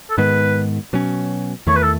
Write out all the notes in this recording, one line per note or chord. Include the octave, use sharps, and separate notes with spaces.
A4
G#2 D#3 G#3 B3 B4
B2 F#3 C#4
E2 D#3 A3 C#5
B4
A4